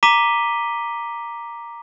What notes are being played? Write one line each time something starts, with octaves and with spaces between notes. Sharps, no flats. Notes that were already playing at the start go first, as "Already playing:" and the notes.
A#5 D6 B6 D#7 G7